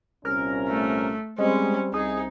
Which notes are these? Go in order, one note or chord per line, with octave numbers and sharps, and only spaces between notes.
C2 A#2 C#4 A#4
A3
G3 G#3 C4 C#4
C2 D#4 G#4